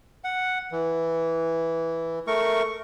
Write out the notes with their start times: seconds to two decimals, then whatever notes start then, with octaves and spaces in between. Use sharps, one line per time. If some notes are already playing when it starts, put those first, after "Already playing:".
0.24 F#5
0.72 E3
2.27 A3 A#4 C#6